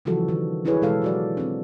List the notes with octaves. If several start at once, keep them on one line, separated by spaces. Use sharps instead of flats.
C#3 E3 F3 G3 F#4 A4
D#3
D4 E4 G#4 B4 C#5
B2 E3 G#3 G4 A4 F5
F#3 F#4 D5
C4 D4